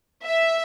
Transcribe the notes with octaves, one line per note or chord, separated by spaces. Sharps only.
E5